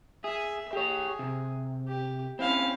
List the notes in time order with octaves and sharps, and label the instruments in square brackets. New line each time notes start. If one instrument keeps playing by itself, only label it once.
[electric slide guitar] G#4 [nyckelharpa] E5
[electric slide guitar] G4 C#5 [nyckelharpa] G#4
[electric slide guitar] C3
[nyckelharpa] G4
[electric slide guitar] C4 C#4 [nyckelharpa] E4 F5